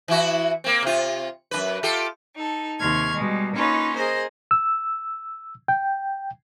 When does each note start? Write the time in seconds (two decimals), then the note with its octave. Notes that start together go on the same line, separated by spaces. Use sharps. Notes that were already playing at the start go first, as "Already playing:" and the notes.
0.08 E3 E4 F#4
0.64 A#3 C4
0.83 C3 F4
1.51 F#2 C#3 B4
1.83 F4 G4 A4
2.37 D#4 A4
2.81 D#2 C3 C6 C#6 F6 G#6
3.13 B2 G3 G#3
3.54 A#3 C#4 D#4 F4 B4 C#5
3.95 G#4 A#4 C5 D#5
4.51 E6
5.68 G5